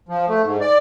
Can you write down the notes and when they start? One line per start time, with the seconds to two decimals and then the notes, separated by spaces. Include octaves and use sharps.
0.09 F3
0.29 A3
0.44 G#2
0.61 D5